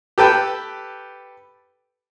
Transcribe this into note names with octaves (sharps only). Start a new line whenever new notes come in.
G4 A4 B4 G5 A5